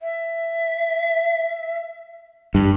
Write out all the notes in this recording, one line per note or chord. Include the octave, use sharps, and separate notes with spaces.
E5
G2